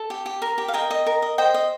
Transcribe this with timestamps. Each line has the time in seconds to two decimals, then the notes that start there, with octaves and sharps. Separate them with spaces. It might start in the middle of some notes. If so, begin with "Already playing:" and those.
Already playing: A4
0.10 G4
0.26 G4
0.42 A#4
0.58 G4
0.68 F5
0.74 A#4 D#5 G5
0.90 D#5
1.06 A#4
1.22 D#5
1.38 C5 D#5 G5
1.54 D#5